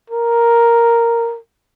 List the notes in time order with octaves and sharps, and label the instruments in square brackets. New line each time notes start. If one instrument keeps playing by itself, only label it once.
[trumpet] A#4